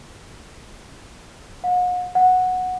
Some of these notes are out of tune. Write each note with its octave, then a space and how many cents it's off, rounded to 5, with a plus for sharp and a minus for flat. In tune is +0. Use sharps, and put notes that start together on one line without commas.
F#5 -40
F#5 -10